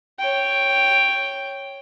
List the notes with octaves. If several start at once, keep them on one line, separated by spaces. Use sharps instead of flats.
C#5 G5